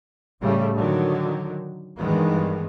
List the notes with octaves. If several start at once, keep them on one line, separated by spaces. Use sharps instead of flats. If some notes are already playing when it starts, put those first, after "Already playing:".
A2 C#3 G3 A3
D3 D#3 F#3
G2 D#3 E3 G#3 B3